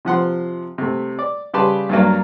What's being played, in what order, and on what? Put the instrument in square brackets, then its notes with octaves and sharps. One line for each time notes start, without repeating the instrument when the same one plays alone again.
[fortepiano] C3 F3 F#5 C6
C3 A3
D5
C#3 G3 G4 B4 A5 C6
G2 F#3 A#3